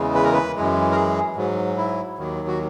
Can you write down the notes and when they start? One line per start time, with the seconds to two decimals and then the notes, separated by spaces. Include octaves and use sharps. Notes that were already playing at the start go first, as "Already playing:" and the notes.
Already playing: E2 C#3 E3 G#3
0.15 B4
0.24 A#4
0.33 B4
0.55 F#2 E3 G#3
0.91 A#4
0.95 G#4
1.36 G#2 F#3
1.77 E4
2.18 D#2 D#3 F#3
2.48 F#4